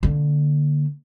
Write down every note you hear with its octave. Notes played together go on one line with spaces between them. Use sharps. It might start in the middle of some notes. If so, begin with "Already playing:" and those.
D3 A#3